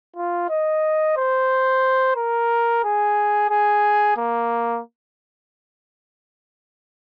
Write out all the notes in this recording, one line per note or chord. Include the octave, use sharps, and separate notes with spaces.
F4
D#5
C5
A#4
G#4
G#4
A#3